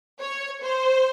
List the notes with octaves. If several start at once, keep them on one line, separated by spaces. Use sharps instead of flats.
C#5
C5